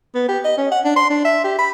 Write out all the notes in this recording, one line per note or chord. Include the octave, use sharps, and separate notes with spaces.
B3
G4
D#5
C#4
F#5
D4
C6
D4
E5
G4
B5